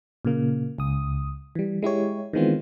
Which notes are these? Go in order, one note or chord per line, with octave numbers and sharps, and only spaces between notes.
A#2 C#3 A#3
C#2 D#6
E3 G3
G#3 E4 G4 C#5
D#3 E3 G#3 B3 C4 F4